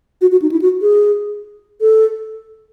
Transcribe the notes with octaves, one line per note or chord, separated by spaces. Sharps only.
F#4
F#4
D#4
E4
F#4
G#4
A4